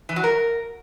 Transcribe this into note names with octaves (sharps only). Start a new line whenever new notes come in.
E3
F#3
A#4